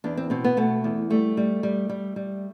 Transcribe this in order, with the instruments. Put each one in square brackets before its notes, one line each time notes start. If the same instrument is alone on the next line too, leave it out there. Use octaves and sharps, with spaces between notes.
[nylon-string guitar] E2 D4
C4
B2 C4
B3
B2 A3
E2
G3 A3
G3
G3
G3
G3